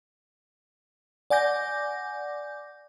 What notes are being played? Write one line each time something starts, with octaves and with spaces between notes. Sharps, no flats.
D5 F#5 G#5 D6 G6 A#6